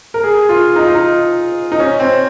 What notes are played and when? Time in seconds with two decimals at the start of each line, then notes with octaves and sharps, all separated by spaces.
0.14 A#4
0.24 G#4
0.49 F4
0.76 D#4
0.85 F4
0.95 D#4
1.72 D#4
1.80 C#4
2.00 C4